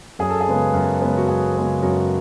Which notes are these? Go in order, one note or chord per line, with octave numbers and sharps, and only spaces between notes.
F#2 G#4
A4
G#4
C#3 G#3 B3
F#2
C#3 G#3 B3
F#4
F#2 G#4
C#3 G#3 B3
F#2 F#4